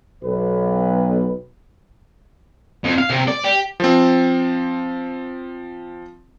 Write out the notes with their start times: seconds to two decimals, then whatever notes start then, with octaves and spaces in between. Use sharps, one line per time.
0.22 B1 B4
2.84 F2
2.98 F5
3.10 C3
3.28 D5
3.44 G4
3.80 F3 C4